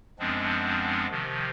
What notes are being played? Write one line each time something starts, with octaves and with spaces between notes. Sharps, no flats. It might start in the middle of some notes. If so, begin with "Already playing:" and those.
F#2 F3 G#3 B3 C4 D4
C3 D#3 F3